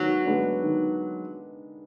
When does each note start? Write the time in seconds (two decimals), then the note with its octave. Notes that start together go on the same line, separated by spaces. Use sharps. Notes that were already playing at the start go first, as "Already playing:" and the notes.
Already playing: D#3 F#3 G#3 B3
0.25 G#3 B3 D4
0.63 D#3